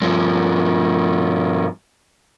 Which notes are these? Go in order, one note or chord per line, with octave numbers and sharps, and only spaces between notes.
G2 F3